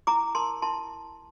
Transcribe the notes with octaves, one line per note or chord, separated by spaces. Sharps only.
E4 A#5 D6
A#4 A5 C6
E4 A5 C6